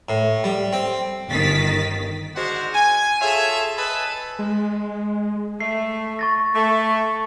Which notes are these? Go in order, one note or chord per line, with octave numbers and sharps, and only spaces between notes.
A2
G3
C4
G1 D#3 A6 B6
G#2 G#3 D4 F#4 C5 F#5
G#5
F4 G#4 A4 C#5 E5
A4 B4 D#5 G#5 A5 B5
G#3
A3 C7
C#6 A6 A#6
A3